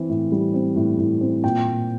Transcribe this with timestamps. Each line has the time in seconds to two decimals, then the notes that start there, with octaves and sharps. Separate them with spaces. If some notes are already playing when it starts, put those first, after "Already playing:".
Already playing: E3 C4
0.09 A2
0.32 G3
0.54 C4
0.76 A2
0.98 A2
1.21 C4
1.43 A#2 G5
1.66 A#2